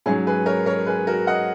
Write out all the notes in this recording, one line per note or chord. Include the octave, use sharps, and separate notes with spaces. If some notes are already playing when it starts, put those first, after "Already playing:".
G#2 F#3 C#4 G#4
G#4 B4
A#4 C#5
A#4 C#5
G#4 B4
F#4 A#4
D#5 F#5